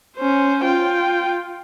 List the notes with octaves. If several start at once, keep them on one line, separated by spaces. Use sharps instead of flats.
C#4 C5
F4 G5